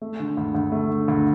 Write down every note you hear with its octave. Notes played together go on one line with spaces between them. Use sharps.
A3
D3
D2
D2
A3
D3
D2